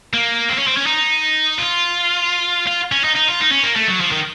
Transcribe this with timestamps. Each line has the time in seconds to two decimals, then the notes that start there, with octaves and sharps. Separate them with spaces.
0.14 A#3
0.50 C4
0.59 C#4
0.68 C4
0.77 C#4
0.87 D#4
1.58 F4
2.67 F4
2.92 C#4
3.04 D#4
3.15 D#4
3.28 F4
3.40 D#4
3.52 C#4
3.63 A#3
3.76 A3
3.88 F#3
4.01 F3
4.11 D#3